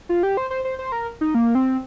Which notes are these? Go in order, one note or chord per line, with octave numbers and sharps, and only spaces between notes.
F4
G4
C5
C5
C5
C5
A#4
D#4
A#3
C4